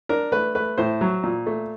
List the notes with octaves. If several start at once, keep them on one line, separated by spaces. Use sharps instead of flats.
D4 A#4
A3 B4
A3 B4
A2 C5
F#3
A#2
A3